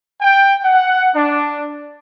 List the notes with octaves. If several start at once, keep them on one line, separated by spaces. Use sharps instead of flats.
G5
F#5
D4